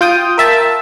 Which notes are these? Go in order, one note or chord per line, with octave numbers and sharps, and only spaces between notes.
F4 G5 D#6
A#4 E5 A5